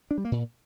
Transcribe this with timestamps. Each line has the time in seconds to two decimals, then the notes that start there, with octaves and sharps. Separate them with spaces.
0.11 D4
0.18 G3
0.25 A#3
0.32 A#2